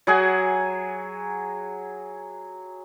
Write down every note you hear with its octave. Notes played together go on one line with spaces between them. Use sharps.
F#3 G#4 F#5 G#5